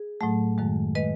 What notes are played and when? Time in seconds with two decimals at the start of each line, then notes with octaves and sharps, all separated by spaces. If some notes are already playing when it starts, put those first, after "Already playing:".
Already playing: G#4
0.21 A2 F#3 A3
0.58 F#2 D#3 G#3
0.95 D#3 G#3 B4 D#5